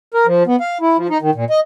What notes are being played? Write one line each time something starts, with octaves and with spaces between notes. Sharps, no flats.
A#4
F3
B3
F5
E4
F3
D#4
D#3
A#2
D#5